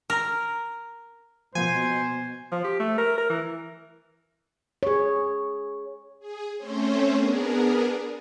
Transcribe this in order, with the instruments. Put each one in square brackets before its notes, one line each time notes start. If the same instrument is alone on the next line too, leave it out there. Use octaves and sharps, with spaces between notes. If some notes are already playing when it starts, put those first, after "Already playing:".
[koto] A#4
[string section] B2 [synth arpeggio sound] F3 A#3 B3 [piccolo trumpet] C5 [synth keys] G#5
[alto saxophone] F3
G4
A3
A#4
A#4
E3
[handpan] G#4 C#5
[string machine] G#4
A3 C4 C#4 C5 C#5
B3 D4 G#4 A#4